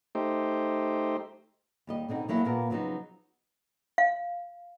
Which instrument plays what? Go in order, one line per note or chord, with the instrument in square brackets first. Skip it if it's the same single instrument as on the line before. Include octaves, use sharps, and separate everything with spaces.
[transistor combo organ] A3 D#4 G4 C5
[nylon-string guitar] D#2 G3 D#5
B2 D3 C4 D#4
E2 F#3 A#3 E4 A5
A#2 A#3 B3 A#4
C#3 F3 F#3 B3 D#4
[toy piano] F5